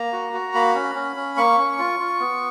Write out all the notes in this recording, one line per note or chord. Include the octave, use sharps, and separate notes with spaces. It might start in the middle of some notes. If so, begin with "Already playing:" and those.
Already playing: A#3 A#5
F#4
F#4
A#3 B5
C#4
C#4
C#4
A#3 C#6
C#4
F4
F4
B3